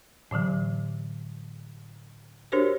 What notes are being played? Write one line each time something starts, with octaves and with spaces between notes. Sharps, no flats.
A2 D3 E3 F#3
D4 F#4 G4 A#4 C5 C#5